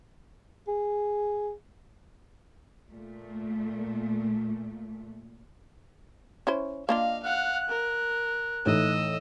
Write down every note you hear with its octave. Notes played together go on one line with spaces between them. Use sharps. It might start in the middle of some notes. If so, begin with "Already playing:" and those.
G#4
A#2 A3
C#4 E4 C5
A#3 D4 F4 D#5 F5
F5 F#5 F#6
A#4
A2 E3 D#4 D#5 E6